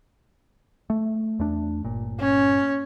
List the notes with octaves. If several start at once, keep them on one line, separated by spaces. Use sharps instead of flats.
A3
E2 A3 D4
G1 A#2
C#4